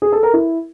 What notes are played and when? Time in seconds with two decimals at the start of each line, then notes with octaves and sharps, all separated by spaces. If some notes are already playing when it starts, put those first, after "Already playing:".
0.02 G#4
0.12 A4
0.23 A#4
0.34 E4